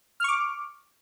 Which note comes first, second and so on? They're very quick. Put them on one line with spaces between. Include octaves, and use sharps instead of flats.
F6 C#6 D6